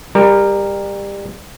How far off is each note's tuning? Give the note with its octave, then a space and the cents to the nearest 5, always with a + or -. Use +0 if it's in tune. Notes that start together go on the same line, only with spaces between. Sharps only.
G3 +25 A#4 +0